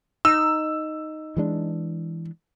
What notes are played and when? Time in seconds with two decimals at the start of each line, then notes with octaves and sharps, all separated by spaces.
0.25 D#4 E6
1.37 E3 G#3 D4